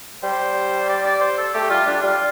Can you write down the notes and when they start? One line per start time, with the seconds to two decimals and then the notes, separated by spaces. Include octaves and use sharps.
0.23 G3 C5
0.89 D5
1.05 D5
1.21 C5
1.38 A4
1.54 A3 G4
1.70 G3 F4
1.87 G3 D4
2.02 G3 F4